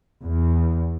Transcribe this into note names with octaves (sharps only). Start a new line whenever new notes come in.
E2